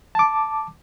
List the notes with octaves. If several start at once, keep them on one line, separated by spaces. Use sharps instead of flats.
A5 D6